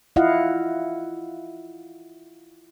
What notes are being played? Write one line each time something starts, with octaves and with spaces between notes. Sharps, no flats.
E4 F4 D#5 F5 F#5